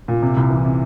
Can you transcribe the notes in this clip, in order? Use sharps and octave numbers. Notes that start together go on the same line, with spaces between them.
A#2
C3
C2
E3
C3